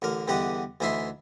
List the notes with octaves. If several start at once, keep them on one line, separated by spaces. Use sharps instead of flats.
A1 D3 A#4
E2 G2 D3 G4 D#5 F#5
D2 E3 D#4 E4 E5 C6